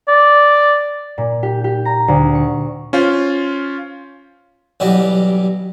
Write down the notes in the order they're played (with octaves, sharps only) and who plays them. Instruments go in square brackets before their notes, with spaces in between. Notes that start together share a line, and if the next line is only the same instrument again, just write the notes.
[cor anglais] D5
[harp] A#2
G4
G4
A#5
D2
C#6
[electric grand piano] C#4 F4 C5
[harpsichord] A1 B2 F#3 G3